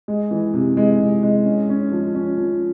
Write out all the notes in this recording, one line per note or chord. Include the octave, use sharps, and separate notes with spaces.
G#3
E3
C3
G#3
C3
G#3
C#4
C#4
F3
C#4
F3